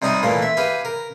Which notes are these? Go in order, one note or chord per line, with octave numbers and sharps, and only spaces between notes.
C3 G3 D#4 F#5 G#5
A#2 E3 A3 A#3
E5
G4 B4 F5 G#5
A#4